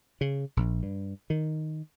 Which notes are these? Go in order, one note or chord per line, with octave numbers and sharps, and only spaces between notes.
C#3
A#1
G2
D#3